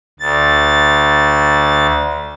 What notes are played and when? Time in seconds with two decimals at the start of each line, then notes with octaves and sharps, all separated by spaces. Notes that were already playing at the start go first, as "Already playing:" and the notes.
0.20 D2 A6